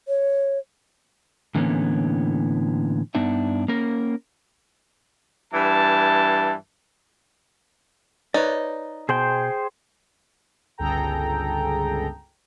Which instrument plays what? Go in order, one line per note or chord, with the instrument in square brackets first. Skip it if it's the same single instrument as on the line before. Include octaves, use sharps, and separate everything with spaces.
[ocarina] C#5
[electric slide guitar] A2 D3 E3 A#3 B3 C#4
G2 B3 D4 D#4 E5
A#3 C#4 A#4
[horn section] G2 E3 A5
[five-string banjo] D#4 [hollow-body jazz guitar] B4 C#5 D5
[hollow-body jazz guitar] B2 [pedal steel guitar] G#4 C5 G5
[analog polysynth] G1 C#2 G#4 A4 G5 A#5